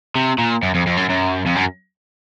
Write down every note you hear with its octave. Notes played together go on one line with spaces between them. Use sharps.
C3
A#2
F#2
F2
F2
F#2
F#2
F2
F#2